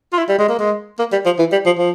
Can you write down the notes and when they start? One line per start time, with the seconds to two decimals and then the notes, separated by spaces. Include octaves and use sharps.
0.13 F4
0.18 E4
0.29 G3
0.39 G#3
0.49 A#3
0.59 G#3
0.99 A#3
1.12 G3
1.25 F3
1.39 E3
1.52 G3
1.66 F3
1.78 F3